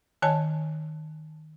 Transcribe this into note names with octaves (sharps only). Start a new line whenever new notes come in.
D#3 C#5 G#5 A5